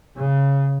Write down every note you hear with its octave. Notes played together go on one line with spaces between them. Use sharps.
C#3